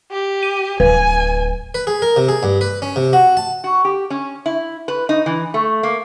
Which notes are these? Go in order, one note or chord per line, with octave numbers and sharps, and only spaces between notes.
G4
D#7
D1 B4 G#5
B4
G#4
A#4
C3
G#4
G2
B4
C#4
C3
F#4
A5
F#4
G4
C#4
E4
B4
D#4
E3
A3
A#3